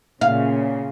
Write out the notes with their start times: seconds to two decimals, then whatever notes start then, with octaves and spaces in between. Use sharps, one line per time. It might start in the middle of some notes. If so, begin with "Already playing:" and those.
0.21 A#2 C#3 F5